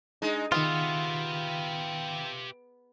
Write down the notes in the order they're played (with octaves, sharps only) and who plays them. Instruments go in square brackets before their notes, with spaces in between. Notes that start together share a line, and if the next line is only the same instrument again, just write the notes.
[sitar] G#3 D#4 [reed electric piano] D4
[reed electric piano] D#3 F5 D#6 [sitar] B3 [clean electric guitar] F4 [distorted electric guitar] G4 E5